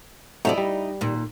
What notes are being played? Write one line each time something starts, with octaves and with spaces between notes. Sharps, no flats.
C3 F#3 A3 D#4 E4 D5
G3
D#2 A#2